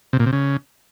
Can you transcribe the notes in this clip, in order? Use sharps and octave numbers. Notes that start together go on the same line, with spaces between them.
C3
A#2
C3
C#3